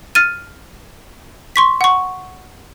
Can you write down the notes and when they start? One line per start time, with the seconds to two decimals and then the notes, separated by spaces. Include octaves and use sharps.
0.15 F6 A6 D#7
1.56 C6 C#6 B6
1.81 F#5 C#6